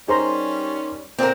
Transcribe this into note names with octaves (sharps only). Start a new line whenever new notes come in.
G3 C#4 D#4 G#4 A#4 C5 A#5 C6
A#2 D3 C4 A#4